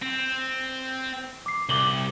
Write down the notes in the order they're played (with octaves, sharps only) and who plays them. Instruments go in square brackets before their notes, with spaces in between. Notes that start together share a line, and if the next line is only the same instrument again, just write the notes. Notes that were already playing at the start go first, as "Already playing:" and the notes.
[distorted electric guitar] C4
[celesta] D6 C7
[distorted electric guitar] C2 [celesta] D6 F#7 G7